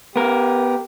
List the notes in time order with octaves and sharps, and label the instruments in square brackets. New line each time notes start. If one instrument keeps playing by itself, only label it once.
[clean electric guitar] B3 A#4 [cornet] G4